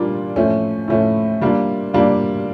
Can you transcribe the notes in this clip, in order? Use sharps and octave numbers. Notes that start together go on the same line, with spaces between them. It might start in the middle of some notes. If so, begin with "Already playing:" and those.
Already playing: A#2 G3 A#3 D4 F4
A2 F3 A3 C#4
A2 F3 A3 C#4
G3 A#3 D4 F4
G3 A#3 D4 F4